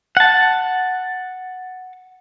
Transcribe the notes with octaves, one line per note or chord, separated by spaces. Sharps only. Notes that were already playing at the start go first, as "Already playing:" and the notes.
F#5 A5